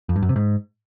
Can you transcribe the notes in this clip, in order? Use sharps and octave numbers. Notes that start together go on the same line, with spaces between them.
F2
G2
F#2
C3
G#2